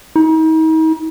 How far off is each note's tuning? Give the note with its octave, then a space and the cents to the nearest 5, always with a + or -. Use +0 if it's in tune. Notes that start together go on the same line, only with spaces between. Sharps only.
D#4 +40